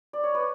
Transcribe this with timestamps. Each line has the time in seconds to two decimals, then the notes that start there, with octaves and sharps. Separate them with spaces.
0.13 D5
0.23 C#5
0.34 B4 D5